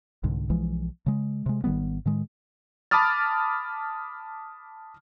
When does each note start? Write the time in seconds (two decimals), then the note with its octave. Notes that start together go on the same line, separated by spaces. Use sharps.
0.24 C2 G#2 D3
0.50 B1 E3 F3 G#3
1.06 C#3 G#3
1.46 C3 G#3
1.64 G#1 D#3 G3 B3
2.06 A2 D#3 G#3
2.91 A5 B5 D6 D#6 F6 A6